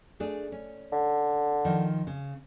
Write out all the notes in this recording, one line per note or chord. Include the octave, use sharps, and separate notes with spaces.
A3 D4 G#4
C#4
D3
D#3 F3
C#3